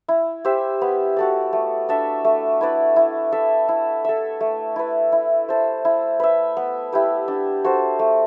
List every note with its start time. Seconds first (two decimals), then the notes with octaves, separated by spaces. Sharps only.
0.08 E4
0.45 G4 C5 E5
0.81 B3
1.17 F#4 A4 D5
1.53 A3
1.89 D4 A4 E5
2.24 A3
2.61 E4 B4 D5
2.96 E4
3.32 A4 E5
3.69 E4
4.05 A4 E5
4.41 A3
4.76 E4 B4
5.12 E4
5.49 A4 C5
5.85 E4
6.20 B4 E5
6.57 B3
6.92 E4 G4 B4
7.28 D4
7.64 F#4 A4 C5
7.99 A3